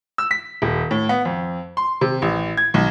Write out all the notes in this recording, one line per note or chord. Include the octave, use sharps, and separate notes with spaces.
E6
B6
D#1
A2
B3
F2
C6
C3
A1
G#6
B1